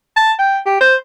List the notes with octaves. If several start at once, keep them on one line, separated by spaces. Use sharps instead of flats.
A5
G5
G4
C5